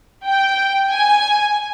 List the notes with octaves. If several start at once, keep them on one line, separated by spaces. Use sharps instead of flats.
G5
G#5